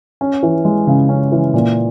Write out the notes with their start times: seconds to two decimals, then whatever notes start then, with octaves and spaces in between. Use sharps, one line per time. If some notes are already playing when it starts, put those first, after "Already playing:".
0.21 C#4
0.43 E3
0.65 G#3
0.87 C#3
1.09 C#4
1.32 E3
1.54 A#2